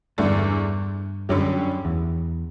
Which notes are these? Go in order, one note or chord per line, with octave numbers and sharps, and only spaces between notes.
E2 G2 D3 A3 D4
F#2 D3 G3 C#4 G4
E2